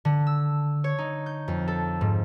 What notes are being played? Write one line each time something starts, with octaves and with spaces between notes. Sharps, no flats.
D3
E6
C#5
D#4
G6
F2
A4
G#2